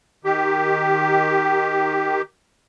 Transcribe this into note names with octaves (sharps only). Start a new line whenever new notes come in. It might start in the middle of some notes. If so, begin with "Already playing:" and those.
D#3 G4